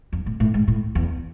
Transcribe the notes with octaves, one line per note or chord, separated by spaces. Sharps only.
F2
A2
A2
G#2
A2
E2